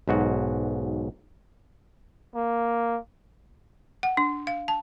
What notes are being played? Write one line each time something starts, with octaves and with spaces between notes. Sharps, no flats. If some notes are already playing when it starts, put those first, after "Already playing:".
B1 G#2 F#4
A#3
F#5
D4
F5
A5